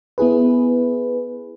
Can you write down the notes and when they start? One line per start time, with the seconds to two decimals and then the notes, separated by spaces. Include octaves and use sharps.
0.18 B3 E4 G#4 B4